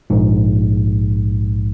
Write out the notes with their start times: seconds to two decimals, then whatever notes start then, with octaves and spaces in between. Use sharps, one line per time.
0.10 A#1 G#2